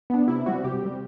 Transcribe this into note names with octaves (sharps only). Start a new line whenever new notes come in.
B3 D4
C3 E4
G3 C4 F#4
C3 G4
G3 C4